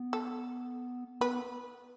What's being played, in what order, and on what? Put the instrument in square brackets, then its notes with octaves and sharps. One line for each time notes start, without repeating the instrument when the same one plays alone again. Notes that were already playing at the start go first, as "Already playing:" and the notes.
Already playing: [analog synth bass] B3
[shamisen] A4
[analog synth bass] B3 [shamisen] B4